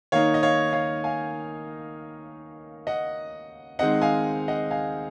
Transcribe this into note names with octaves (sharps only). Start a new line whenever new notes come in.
D#3 A#3 D#4 C#5 F5
D#5
C#5 F5
C#5 F5
F5 G#5
D#5 F#5
D#3 G#3 C4 D#4 D#5 F#5
F5 G#5
D#5 F#5
F5 G#5